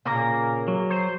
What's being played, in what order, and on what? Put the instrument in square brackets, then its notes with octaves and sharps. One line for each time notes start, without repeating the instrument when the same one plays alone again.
[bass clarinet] A#2 [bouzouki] C#3 A#4 A#5 [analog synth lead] A#3
[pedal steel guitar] F#3
[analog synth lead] C5